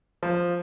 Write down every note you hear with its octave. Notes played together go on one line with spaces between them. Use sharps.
F3